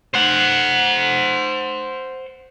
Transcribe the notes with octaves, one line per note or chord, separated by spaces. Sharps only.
C5 F#5